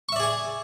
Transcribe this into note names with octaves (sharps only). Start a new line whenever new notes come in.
G#4 D5 E5 G#5 C#6